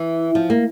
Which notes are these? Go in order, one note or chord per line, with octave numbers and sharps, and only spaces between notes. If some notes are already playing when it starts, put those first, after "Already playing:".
Already playing: E3
F3
A#3